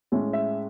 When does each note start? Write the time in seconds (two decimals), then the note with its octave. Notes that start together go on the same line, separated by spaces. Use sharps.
0.12 A2 G#3 C#4
0.33 E5